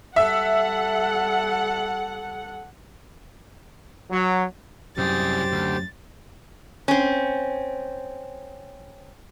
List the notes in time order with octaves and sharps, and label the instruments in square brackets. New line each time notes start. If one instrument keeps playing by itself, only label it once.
[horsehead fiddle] G3 A4 [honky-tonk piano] E5 [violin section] F#5
[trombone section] F#3
[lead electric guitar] C2 G#4 [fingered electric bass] F#2 [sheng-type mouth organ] G4 C5 [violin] A6
[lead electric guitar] D2
[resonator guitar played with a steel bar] C4 C#4